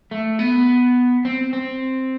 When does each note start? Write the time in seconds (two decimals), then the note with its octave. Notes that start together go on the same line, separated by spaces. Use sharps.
0.11 A3
0.39 B3
1.25 C4
1.53 C4